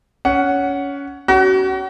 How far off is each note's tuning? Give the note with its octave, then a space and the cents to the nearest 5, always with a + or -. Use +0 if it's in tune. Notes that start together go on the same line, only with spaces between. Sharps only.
C#4 +20 F#5 +0
C#4 +25 F#4 +35